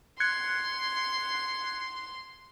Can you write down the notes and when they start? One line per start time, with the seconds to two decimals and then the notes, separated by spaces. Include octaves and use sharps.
0.20 C6 F#6 G#6 C#7